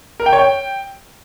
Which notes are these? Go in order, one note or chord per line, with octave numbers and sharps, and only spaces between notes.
A#4
G5
C#5
G5